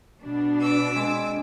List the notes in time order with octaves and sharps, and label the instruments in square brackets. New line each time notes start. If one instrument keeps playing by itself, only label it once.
[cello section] B2 D4
[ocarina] B4 [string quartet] D6 E6
[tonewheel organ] G#3 [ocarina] C4